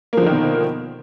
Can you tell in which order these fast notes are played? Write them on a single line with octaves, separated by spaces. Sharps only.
A#3 F3 D3 D#3 B2